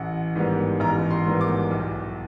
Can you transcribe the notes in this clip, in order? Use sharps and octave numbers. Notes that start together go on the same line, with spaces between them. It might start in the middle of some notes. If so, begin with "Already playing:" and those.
Already playing: A1 F#5
G#2 D#3 G3 B3
A1 A#5
C6
G#2 D#3 G3 B3
D6
B1